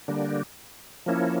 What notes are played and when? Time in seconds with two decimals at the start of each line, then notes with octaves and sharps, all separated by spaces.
0.08 D3 G3 A#3 D4
1.06 F3 A#3 C#4 E4